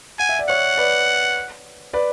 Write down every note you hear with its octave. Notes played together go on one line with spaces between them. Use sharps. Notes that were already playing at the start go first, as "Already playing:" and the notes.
F#5 G#5
E5
D5
C#5 E5 F#5
B4 D5
B4 D5